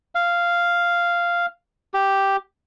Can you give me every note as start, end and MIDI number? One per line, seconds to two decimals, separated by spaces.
0.15 1.46 77
1.94 2.37 67